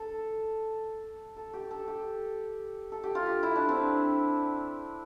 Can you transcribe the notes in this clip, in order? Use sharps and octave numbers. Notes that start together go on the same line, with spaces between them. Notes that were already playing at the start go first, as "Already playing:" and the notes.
Already playing: A4
A4
G4
A4
G4
A4
G4
F4
G4
E4
D4
C4